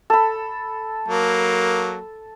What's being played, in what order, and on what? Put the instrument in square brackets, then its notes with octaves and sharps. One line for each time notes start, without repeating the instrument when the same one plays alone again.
[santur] A4 B5
[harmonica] F#3 A#3